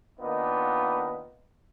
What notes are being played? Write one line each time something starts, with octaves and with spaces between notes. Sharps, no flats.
D#3 A#3 B3 D4 D#4 F4